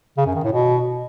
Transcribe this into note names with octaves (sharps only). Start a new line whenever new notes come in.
C#3
F#2
D#3
A2
B2